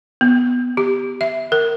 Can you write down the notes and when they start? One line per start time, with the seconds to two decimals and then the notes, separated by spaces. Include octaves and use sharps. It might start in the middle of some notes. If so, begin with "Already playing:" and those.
0.21 B3
0.77 G4
1.21 E5
1.52 A#4